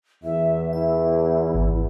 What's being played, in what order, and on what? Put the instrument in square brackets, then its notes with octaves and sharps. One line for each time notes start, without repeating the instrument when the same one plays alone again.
[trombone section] E2 [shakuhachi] E5
[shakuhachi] E4 [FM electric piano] E5
[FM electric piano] G#1